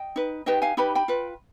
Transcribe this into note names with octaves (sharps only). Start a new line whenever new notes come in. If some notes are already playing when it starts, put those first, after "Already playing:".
Already playing: D#5 G5
D#4 B4
D#4 G4 B4 D#5 G5
F5 G#5
D#4 G4 B4 B5
G5 B5
F4 B4